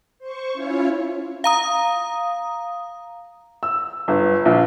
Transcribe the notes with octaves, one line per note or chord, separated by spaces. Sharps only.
C5 C#6
C#4 E4 F4 C#5
F5 A#5 D#6
E6
G1
A#1